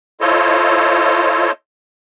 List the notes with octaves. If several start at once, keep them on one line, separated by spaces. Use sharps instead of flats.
E4 F4 A4 C5 C#5 D#5